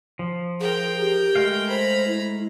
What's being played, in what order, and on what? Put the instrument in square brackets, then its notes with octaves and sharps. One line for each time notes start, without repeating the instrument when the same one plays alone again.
[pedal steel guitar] F3
[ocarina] G#4 [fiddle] A#4 G5
[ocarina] G4
[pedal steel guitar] G#3 A3 F5
[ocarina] C5 [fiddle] A#5 B5
[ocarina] E4